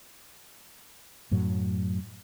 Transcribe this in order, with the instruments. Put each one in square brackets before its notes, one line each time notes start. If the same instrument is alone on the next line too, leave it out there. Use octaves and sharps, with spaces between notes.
[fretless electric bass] F#2 A2 F#3